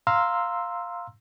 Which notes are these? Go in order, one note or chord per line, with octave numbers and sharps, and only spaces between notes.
F5 A#5 C6 E6 F6